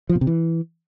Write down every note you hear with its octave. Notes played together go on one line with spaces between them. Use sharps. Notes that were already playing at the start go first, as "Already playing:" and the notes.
F3
B2
C3
E3